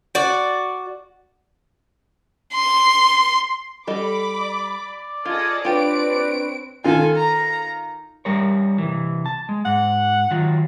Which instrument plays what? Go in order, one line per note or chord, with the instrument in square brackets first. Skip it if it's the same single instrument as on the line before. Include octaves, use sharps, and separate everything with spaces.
[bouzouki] F#4 D5
[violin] C6
[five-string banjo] G3 A4 D#5 [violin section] B5 D6
[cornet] D5
[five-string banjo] F4 [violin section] G#4 A4 D#5 [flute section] F6 G#6
[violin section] C4 C#5 D7 [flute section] D4 B4 [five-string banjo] F4 G4
[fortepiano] D#3 F4 [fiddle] A4 G#5
[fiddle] A#5
[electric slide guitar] G3 A#4 C#5
C3 E3
A5
G#3
[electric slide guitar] G#2 [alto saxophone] F#5
[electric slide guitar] D#3 F#3 F4